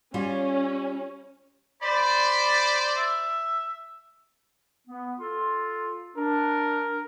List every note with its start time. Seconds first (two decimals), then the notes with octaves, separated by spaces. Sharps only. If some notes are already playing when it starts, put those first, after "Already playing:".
0.14 G3 C#4 F4
1.82 C5 D5 B5
2.97 E5
4.88 B3
5.20 F4 A4 C6
6.17 D4 A#4